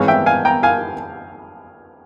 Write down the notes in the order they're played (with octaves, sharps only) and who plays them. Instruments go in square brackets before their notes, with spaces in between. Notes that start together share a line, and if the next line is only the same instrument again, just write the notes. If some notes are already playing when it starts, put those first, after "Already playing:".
Already playing: [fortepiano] G#2 E3 G#3 C4 C#5 F5
E5 G5
F5 G#5
G5 A#5
F5 G#5